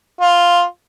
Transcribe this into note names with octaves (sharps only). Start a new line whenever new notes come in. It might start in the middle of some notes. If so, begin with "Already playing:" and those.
F4